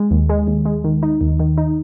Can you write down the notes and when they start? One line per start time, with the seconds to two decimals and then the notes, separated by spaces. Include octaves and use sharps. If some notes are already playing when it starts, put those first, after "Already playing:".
Already playing: G#3
0.11 D#2
0.29 G#3
0.47 D#2
0.65 G#3
0.84 D#3
1.03 D#4
1.21 D#2
1.40 D#3
1.58 D#4